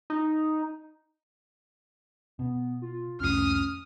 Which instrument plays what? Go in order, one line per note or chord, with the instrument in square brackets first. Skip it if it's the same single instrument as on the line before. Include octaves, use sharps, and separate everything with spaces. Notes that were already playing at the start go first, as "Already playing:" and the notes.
[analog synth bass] D#4
[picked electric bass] B2 [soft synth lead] B3
[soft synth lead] F4
[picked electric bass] C2 F2 A2 [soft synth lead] C#4 [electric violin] D#6 F6